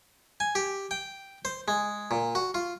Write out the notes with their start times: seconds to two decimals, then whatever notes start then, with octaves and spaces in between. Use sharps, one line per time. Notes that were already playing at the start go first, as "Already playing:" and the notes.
0.40 G#5
0.55 G4
0.91 G5
1.45 C5
1.68 G#3
2.11 A#2
2.35 F#4
2.54 F4